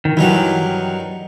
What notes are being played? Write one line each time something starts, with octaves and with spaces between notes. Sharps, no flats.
D#3
G2 D#3 E3 F#3